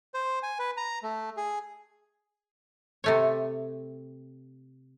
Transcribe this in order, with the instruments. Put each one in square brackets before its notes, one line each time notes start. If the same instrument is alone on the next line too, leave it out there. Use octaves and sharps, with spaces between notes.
[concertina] C5
G#5
B4
A#5
A3
G#4
[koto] C3 A3 C#5